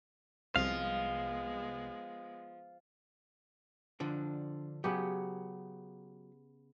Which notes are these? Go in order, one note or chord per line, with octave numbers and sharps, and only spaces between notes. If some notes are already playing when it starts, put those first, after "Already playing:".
C2 F3 G#3 B3 F5
D3 F3 D4
C#3 F#3 B3 G4